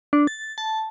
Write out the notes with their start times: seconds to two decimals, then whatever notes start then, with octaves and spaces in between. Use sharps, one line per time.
0.13 D4
0.27 A6
0.58 A5